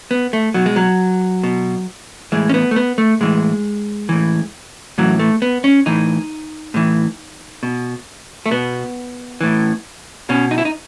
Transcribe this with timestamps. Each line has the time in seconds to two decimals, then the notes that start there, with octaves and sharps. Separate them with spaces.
0.11 B3
0.33 A3
0.54 B2 F#3
0.66 G#3
0.76 F#3
1.43 B2
2.32 A2 E3 G#3
2.49 C#4
2.54 B3
2.71 A3
2.76 B3
2.98 A3
3.21 A2 E3 G#3
4.09 A2 E3
4.98 A2 E3 F#3
5.19 A3
5.42 B3
5.64 C#4
5.86 A2 E3 D#4
6.74 A2 E3
7.63 B2
8.46 A3
8.51 B2 B3
9.41 A2 E3
10.29 B2 C#4
10.51 D#4
10.58 E4
10.65 D#4